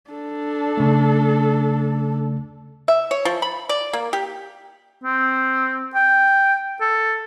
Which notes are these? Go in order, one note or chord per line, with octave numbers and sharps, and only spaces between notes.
D4 A4
C#3 A3
E5
C#5
F3
B5
D5
A#3
G4
C4
G5
A4